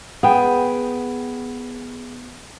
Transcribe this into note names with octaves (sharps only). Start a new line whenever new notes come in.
B3 G#4 G5